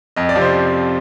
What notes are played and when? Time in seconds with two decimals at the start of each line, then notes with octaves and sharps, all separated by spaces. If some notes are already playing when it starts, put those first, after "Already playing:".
0.16 F2 D#5
0.29 D5
0.35 C3 F3
0.41 C5